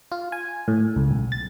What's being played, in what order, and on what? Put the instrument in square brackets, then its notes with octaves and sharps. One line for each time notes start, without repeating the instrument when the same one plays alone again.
[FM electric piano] F4
G#5
A2
C#2
B1
A6